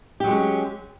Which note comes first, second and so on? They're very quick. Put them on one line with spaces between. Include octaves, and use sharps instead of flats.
G4 F#3 G#3 C#4